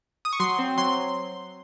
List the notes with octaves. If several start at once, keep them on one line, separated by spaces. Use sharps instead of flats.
D#6
C#6
F#3 C6
C4
F#3 C6